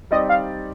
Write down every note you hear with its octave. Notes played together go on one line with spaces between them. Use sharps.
G3 C4 D#4 G4 D5 D#5
F5